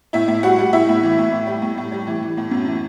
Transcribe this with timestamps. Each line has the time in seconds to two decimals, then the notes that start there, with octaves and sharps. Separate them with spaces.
0.13 A2 E4 E5
0.28 A2
0.43 G3 F#4 F#5
0.58 G3
0.73 A2 E4 E5
0.89 A2
1.03 E3
1.18 A2
1.32 A2
1.47 G3
1.62 A2
1.78 A2
1.92 G3
2.07 E3
2.23 E3
2.37 A2
2.51 F#2
2.67 E3